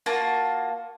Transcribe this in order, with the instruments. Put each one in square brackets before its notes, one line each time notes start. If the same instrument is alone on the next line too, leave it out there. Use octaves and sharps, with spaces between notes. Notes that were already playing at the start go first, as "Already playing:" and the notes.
[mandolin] A#3 F4 F#4 A5